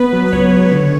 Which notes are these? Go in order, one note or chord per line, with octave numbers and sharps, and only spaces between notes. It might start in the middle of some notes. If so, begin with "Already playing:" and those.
Already playing: B3 B4
F#3
B4
C#2 C#5
C#2
D3